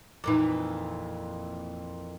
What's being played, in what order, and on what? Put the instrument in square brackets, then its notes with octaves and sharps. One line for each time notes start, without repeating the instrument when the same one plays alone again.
[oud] F2 A#2 E3 [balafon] D#4 D6